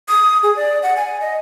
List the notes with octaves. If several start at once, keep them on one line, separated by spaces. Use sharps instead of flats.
D#6
G#4
D5
F#5
G#5
D#5